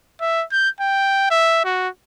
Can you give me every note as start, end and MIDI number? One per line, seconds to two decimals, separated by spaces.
0.21 0.44 76
0.52 0.69 91
0.81 1.28 79
1.31 1.63 76
1.64 1.88 66